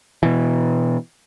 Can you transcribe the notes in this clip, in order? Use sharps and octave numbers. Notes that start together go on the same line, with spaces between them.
B2 E3